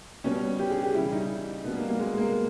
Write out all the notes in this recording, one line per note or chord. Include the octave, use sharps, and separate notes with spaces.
B2 G3 C#4
G4
G#4
G4
C#3 E3 G3 E4
E4
D#4
B2 G3 B3
A#3
A#3
G#3
A#3